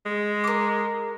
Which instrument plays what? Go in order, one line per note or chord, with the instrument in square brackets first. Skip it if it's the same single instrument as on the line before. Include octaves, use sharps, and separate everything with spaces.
[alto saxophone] G#3
[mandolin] A#4 D6